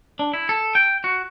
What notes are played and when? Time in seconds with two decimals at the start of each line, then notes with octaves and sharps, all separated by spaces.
0.19 D4
0.34 E4
0.49 A4
0.75 G5
1.04 F#4